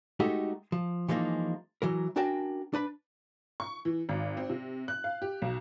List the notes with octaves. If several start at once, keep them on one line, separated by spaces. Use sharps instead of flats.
G#3 A3 D#4 F#4 G4 A4
F3
E3 F3 G#3 A#3 D#4
E3 F#3 A#4
C#4 D4 F#4 A#4 G5 A5
D4 B4 B5
C#6
E3
G#1
C4
C3
F#6
F5
G4
B1